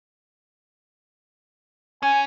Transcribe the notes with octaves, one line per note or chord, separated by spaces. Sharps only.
C#4 G#5